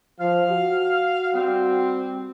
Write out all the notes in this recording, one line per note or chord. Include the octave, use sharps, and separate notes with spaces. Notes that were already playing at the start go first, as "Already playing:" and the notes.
F3 F5
F#4
G3 C4